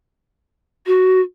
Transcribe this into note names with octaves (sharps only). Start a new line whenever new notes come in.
F#4